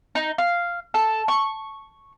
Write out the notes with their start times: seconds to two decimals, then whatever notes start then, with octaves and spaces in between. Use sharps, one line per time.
0.15 D#4
0.38 F5
0.94 A4
1.28 C#6